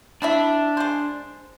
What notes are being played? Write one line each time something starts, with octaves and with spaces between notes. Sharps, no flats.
C4 D4 E4 E5
G#3 C5